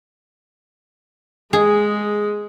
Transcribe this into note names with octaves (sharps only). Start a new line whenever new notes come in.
G#3 G#4